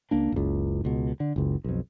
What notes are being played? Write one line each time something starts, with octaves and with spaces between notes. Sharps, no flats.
C#2 A#3 D4
F#1 C#2
C#2 B2
D3
F#1 C#2
B1 F2